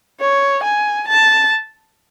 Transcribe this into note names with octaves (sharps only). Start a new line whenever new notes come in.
C#5
G#5
A5